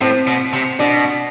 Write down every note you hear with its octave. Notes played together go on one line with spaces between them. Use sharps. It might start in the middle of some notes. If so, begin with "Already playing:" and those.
A2 C4 C5
B2
C3
B2 D4 D5